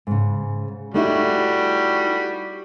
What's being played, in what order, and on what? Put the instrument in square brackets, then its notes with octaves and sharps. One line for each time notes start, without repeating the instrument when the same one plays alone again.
[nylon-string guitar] G#2 C#3
[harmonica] G3 F#4 [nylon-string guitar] A3 D#4 E4